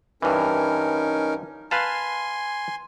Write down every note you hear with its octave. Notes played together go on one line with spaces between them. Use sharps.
G2 E3 C#4 D#4 A#4
B4 F5 G#5 A5 C6